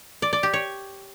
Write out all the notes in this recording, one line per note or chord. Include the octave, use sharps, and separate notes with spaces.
D5
D5
G4
C#5